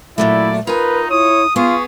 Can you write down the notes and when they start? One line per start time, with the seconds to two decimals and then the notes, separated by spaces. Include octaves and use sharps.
0.18 A#2 F#3 A3 E4 D5 E5
0.67 D#4 F4 A#4 B4 G#5
1.10 E4 C#5 D#6
1.56 B3 F4 G#4 C#6